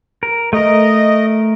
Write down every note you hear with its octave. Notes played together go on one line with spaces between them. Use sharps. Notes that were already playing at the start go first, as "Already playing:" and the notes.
A#4
A3 A#4 D#5